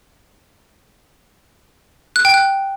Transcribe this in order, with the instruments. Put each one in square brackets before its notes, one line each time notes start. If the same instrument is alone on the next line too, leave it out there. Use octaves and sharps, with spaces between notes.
[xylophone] F#6
G5
F#6